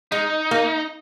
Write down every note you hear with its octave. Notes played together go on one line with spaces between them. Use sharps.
G#3 D#4
A#3